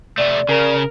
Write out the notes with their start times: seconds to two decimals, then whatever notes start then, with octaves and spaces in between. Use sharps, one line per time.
0.18 C3 A3 D5
0.49 C#3 A#4